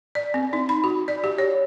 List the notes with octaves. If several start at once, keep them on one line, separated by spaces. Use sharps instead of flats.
D5
C4
D#4
B5
F#4
D5
G4
C#5